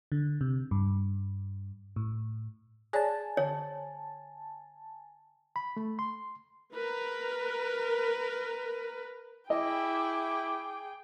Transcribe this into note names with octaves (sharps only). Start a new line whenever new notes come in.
D3
C3
G2
A2
G#4 C#5 D5 G#5 A5
D3 C#5
B5
A3
C6
A#4 B4
E4 G#4 D#5 G5 D6